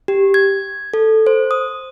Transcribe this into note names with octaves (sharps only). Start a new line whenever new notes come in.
G4
G#6
A4
C5
D#6